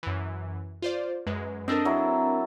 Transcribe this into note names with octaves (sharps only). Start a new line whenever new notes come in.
F#2 E3
F4 C5 D5
F#2 G#3 B4
C4 D4 A4 A#4 D#5
F#3 E4